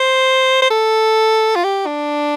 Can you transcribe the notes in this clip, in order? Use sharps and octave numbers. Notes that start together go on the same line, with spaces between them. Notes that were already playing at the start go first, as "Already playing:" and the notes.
Already playing: C5
C5
A4
F4
G4
D4